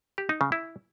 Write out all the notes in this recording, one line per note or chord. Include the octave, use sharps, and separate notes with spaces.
G4
D#4
C#3
E4